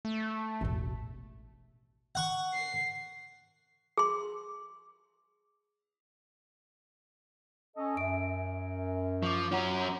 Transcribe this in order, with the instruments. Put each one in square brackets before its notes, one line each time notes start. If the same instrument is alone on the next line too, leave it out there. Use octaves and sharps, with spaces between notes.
[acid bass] A3
[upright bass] E1 A1
[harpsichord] F#5 C#6
[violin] C7
[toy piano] G#4 C6
[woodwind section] C#4 A4 D#5
[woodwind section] F#2 [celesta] E5 D7
[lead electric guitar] F3 [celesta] C#6 D6
[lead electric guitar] F#3 C#4 [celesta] F4 F#5 A#5